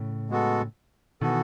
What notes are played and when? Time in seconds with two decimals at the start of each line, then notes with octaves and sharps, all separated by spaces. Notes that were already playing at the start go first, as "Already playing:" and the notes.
Already playing: A2 C#3
0.30 G#3 B3 F#4 A4
1.21 B2 D#3 E3 B3 F#4 A4